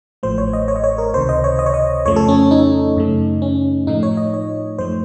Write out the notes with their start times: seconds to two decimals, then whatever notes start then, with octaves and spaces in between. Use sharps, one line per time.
0.23 A1 A2 F3 A3 C5
0.38 C#5
0.53 D#5
0.68 C#5
0.76 D#5
0.84 C#5
0.98 A#4
1.14 C#2 C3 D#3 C5
1.29 D#5
1.44 C#5
1.59 D#5
1.66 C#5
1.74 D#5
2.06 F2 C#3 F3 A3 C#5
2.16 A4
2.28 C#4
2.40 C#4
2.51 D#4
2.96 F#2 C#3 A3
3.42 C#4
3.87 A2 F3 A3 D#4
4.03 C#5
4.17 D#5
4.34 C#5
4.78 F#2 F3 A3 C5